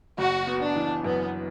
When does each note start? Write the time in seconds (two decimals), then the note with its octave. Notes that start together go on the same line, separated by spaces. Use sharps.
0.18 F#1 F#4
0.47 B3
0.62 D4
0.76 E3
1.04 F#2 B3